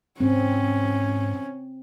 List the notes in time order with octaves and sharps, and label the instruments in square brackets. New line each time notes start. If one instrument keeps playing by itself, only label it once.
[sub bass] G#2 [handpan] C4 [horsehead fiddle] C#4